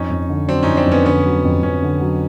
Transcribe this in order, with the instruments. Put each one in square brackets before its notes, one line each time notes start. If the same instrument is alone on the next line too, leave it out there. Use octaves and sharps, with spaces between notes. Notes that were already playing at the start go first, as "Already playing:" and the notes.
Already playing: [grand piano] F2 [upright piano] C#4 D#4
[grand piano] F2
D3
[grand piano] F#3 [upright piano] C4 D4
[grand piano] F2 [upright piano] C#4 D#4
[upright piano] C4 D4
[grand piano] F2
[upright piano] B3 C#4
[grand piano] D3 [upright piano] B3 C#4
[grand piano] F#3
F2
[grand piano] F2 [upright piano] B3 C#4
[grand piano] D3
F#3